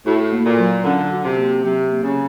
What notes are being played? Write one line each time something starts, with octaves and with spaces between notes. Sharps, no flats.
A2 F#4
A#3
A#2
F#3
D3 C#4
F#4
C3
A#3
C3 F#3
A#3
C#3